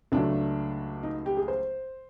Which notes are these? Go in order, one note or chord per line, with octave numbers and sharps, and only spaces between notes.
C#2 C#3 F#3 A3 D4
D#4
G4
G#4
C5